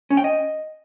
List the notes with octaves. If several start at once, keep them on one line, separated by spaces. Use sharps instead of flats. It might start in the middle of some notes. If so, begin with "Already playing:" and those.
C#4
G5
D#5